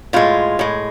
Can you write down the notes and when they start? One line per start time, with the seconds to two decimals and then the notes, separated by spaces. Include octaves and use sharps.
0.13 A2 G#3 F4
0.59 A2 G#3